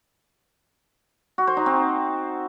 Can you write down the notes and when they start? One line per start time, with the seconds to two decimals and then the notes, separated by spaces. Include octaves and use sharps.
1.38 F#4
1.47 C5
1.57 D#4
1.66 C4